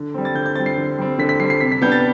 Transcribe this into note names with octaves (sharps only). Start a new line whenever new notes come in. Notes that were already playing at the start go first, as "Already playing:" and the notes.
Already playing: D3
G3 C4
A6
D3 G6
G6
G3 C4 A6
C7
D3
G3 C4
D3 B6
B6
G3 C4 C7
C7
C3 B6
B6
G3 B3 D4 G6
A6